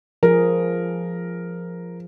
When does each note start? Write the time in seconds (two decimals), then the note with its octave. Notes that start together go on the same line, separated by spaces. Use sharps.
0.23 F3 G#4 A#4